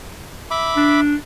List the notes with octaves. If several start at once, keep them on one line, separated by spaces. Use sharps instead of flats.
E5 B5 D6
D4